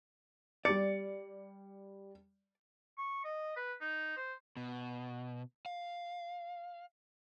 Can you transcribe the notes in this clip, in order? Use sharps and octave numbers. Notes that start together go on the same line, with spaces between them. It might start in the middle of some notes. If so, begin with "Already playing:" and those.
G3 D5 C#7
C#6
D#5
B4
D#4
C5
B2
F5